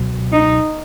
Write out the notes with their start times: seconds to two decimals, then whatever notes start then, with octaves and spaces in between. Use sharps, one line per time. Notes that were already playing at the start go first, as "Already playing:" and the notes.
Already playing: C#2 B2 F#3
0.32 D#4